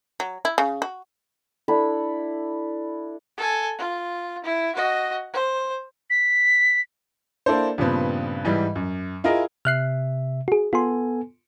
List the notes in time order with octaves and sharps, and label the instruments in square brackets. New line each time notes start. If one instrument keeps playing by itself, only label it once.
[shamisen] F#3
E4
C#3
F#4
[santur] D4 E4 A4 B5
[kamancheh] A4 G#5
F4
E4
F#4 D#5
C5
[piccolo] B6
[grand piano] A#3 D4 E4 A4 C5
G2 A#2 C#3 F3 B3 C4
G#2 E3 G3
F#2
E4 F4 G#4 A#4 D#5
[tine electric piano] C3 E5 [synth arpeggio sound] F6 F#6 C7
[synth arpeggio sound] F#4 G#4
[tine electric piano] B3 A4 G#5 [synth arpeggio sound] F4 C6